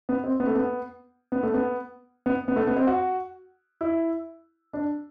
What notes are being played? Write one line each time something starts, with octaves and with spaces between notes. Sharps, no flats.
B3
C4
B3
A3
B3
B3
A3
B3
B3
B3
A3
B3
C4
F#4
E4
D4